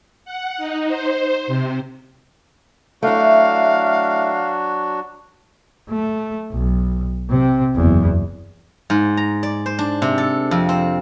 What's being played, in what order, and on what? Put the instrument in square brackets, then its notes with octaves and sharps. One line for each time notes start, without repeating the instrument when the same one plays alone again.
[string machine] F#5
D#4
C5
C3
[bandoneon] F#3 D4 F#4 [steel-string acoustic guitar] A3 E4 [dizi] F5
[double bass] A3
B1
C3 C4
F#1 E2
[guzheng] G#2
A#5
D5
C5
D4
C3
A4
F2
C4